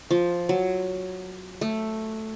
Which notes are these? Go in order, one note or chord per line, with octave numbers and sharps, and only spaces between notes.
F3
F#3
A3